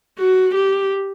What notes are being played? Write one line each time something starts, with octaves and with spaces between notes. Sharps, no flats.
F#4
G4